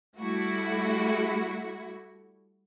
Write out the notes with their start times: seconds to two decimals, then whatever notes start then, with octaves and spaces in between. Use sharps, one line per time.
0.17 G3 A3 E4 F#4